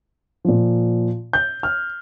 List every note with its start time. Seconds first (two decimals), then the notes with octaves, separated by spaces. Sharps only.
0.45 A#2 F3
1.33 G6
1.63 F6